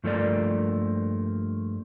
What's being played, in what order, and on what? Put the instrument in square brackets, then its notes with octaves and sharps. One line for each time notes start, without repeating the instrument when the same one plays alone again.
[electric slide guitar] G2 F3 A3 A#3 D5